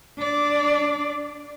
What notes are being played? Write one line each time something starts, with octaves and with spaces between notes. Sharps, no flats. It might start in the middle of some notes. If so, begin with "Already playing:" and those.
D4 D5